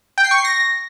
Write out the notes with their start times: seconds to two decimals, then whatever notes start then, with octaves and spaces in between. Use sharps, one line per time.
0.18 G5
0.24 C7
0.31 C#6
0.38 C7
0.45 A#6